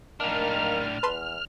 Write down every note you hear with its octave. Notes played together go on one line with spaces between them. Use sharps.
A2 D#3 A#3 D4 F6
E2 B4 A5 C6